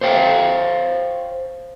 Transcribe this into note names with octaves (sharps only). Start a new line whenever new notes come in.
C5 C#5 F5 G5